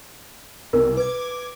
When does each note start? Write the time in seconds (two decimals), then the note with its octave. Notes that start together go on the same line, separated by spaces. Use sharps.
0.73 C2 A#4
0.97 B4 D6 G#6